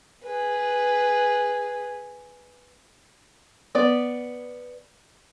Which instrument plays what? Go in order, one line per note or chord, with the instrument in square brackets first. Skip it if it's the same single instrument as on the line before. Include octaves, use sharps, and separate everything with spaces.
[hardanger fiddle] G#4 B4
[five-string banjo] B3 D5